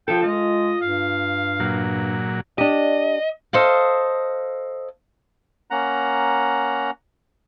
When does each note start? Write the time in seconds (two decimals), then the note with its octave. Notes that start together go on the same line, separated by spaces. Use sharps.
0.08 F3 G4 A4 G5
0.23 G#3 F4 D#5
0.81 G2 F5
1.60 A#2 F#3
2.58 D4 G4 D#5
3.53 A4 C5 D#5 F5
5.71 A#3 C#4 F#5 A#5